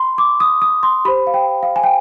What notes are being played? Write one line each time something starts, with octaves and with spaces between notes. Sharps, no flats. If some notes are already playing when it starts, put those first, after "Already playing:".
Already playing: B5 C6
D6
D#6
D#6
C6
G4 C5 B5
F5
G5
F5
G#5
G5